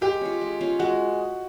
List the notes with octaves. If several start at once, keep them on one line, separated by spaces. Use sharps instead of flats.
G#3 G4
C#4 F4
G#3
C#4 F4
G#3 F#4